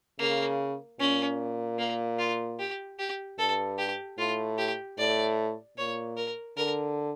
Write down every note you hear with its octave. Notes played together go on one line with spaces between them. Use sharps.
C#3 A#3
A#2 C#4
A#3
F4
G4
G4
G2 A4
G4
A2 F4
G4
A2 D5
A#2 C#5
A#4
D3 A#4